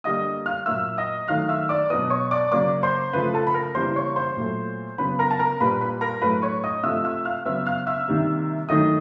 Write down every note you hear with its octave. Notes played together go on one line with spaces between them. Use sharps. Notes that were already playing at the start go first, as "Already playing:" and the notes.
D3 G3 A#3 D#5 D#6
F5 F6
A#2 F#3 A#3 E5 E6
D#5 D#6
D#3 F#3 A3 F5 F6
E5 E6
D5 D6
B2 F#3 B3 D#5 D#6
C#5 C#6
D5 D6
C#3 F#3 A#3 D5 D6
C5 C6
C#3 F3 A3 B4 B5
A4 A5
B5
A#4 A#5
C#3 E3 G3 A#3 C5 C6
C#5 C#6
C5 C6
A#2 F#3 A3
C#3 F#3 B3 B4 B5
A#4 A#5
A5
A#4 A#5
A#2 G3 A#3 B4 B5
B4 B5
A#4 A#5
A2 F#3 A3 B4 B5
C#5 C#6
D#5 D#6
C3 F3 A3 E5 E6
E5 E6
F5 F6
C#3 F#3 B3 E5 E6
F5 F6
E5 E6
C3 D#3 G3 A#3
D#3 F#3 A3 D#5 D#6